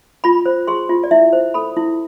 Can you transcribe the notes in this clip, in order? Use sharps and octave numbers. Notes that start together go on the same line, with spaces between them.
F4 B5
C5
G#4 C6
F4
D5
E4 E5
C5
A4 B5
E4